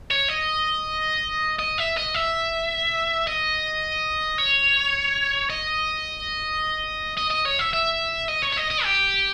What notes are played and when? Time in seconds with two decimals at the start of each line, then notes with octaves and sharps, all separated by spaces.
0.11 C#5
0.29 D#5
1.59 D#5
1.78 E5
1.97 D#5
2.15 E5
3.27 D#5
4.38 C#5
5.50 D#5
7.18 D#5
7.31 D#5
7.45 C#5
7.59 E5
7.73 E5
8.28 D#5
8.42 C#5
8.53 C#5
8.57 D#5
8.70 D#5
8.84 G4